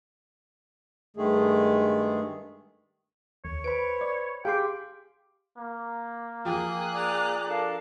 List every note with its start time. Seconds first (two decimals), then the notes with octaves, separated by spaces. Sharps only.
1.17 G2 D#3 G#3 A3 G#4
3.45 D#2 C#5
3.64 B4 C5 B5 D7
4.01 D5
4.45 G4 G#4 F5 G5 C6 D6
5.58 A#3
6.45 F3 G#4 G5 F#6
6.94 D5 A#5 D6
7.47 D4 A4 A#4 F5